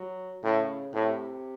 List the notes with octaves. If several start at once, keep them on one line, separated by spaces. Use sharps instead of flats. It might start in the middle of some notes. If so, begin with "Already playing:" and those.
Already playing: F#3
A2 C#3
A2 C3